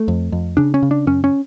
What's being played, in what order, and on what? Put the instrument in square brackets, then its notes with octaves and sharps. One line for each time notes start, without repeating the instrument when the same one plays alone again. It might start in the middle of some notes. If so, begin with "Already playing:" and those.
Already playing: [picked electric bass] A3
F2
F2
C#3 D4
C#4
C#3
D4
F#2 C#4
C#4